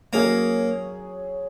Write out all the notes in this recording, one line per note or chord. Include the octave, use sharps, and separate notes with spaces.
F#3 A#3 C#4 G#4